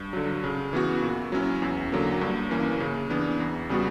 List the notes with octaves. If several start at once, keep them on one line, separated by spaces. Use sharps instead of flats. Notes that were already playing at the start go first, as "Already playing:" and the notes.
Already playing: G2
D3 F#3
C#3
E3 B3 F#4
A#2
F#3 C#4 E4
E2
D3 F#3 A#3
G2
E3 A#3 C#4
C#3
E3 B3 D4
E2
C#3 G3 B3 F#4